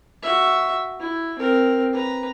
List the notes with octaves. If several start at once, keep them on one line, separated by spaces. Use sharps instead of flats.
F#4 E5
E4
C4 A#4
B4 A#5